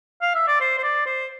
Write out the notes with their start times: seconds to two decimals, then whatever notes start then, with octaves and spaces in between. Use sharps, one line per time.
0.22 F5
0.35 E5
0.47 D5
0.61 C5
0.78 C5
0.84 D5
1.06 C5